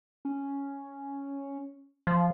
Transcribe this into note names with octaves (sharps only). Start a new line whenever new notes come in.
C#4
F3